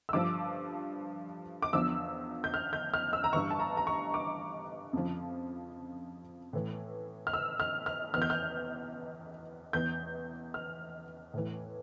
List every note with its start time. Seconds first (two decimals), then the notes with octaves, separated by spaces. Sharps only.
0.09 E6
0.13 G2 D3 F3 D6
1.62 D6
1.73 E2 D3 F3 E6
2.44 G6
2.54 F6
2.73 G6
2.94 F6
3.13 E6
3.24 A#5
3.33 G2 E3 C#6
3.50 A5
3.60 A#5
3.77 A#5
3.87 C#6
4.14 D6
4.93 F2 C#3 F3
6.53 A2 E3
7.27 F6
7.33 E6
7.60 F6
7.86 F6
8.14 E2 E3 F6
8.22 G6
8.30 F6
9.73 E2 E3 G6
10.54 F6
11.34 A2 E3